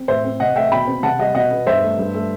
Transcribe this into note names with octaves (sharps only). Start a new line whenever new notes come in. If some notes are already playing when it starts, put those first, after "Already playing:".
Already playing: C4
A2 C5 E5
C4
C3 D#5 F#5
A3 E5 G5
B2 G5 B5
C4
C3 F#5 A5
G3 D#5 F#5
B2 D#5 F#5
B3
G2 C5 E5
A3
G2
A3